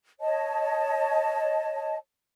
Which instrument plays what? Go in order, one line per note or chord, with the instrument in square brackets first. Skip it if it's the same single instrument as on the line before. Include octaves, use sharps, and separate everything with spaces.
[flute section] C#5 D#5 A5